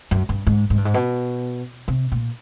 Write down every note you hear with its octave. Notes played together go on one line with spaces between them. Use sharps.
F#2
G2
G#2
G#2
G2
G#2
B2
C3
A#2